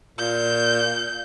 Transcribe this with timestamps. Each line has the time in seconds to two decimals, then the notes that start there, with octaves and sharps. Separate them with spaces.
0.19 A#2 G6